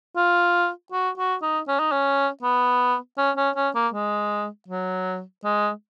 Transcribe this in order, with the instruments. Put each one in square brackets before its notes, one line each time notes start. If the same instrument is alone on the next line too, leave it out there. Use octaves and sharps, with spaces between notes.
[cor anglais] F4
F#4
F#4
D#4
C#4
D#4
C#4
B3
C#4
C#4
C#4
A#3
G#3
F#3
G#3